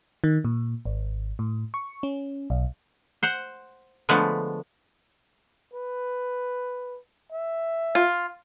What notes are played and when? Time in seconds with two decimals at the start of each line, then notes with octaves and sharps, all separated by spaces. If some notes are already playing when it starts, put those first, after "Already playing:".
0.24 D#3
0.44 A#2
0.86 G#1
1.39 A2
1.74 C#6
2.03 C#4
2.50 B1
3.23 C5 F#5
4.09 D3 F3 G#3 A3 B3
5.74 B4
7.32 E5
7.95 F4